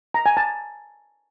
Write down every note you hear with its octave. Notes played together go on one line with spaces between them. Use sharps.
A#5
G#5
A5